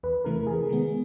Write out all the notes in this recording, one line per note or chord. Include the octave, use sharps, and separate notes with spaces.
E2 B4
C3 E3 A3 A#4
C3 G#4
D#3 G#3 B3